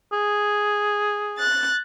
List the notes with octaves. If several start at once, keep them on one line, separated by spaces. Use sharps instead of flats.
G#4
F#6 A6